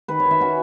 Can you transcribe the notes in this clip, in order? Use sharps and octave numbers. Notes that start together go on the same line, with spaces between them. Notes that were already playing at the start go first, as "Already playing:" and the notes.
D#3 B4
C#5
D#3
E5
C#4 F#4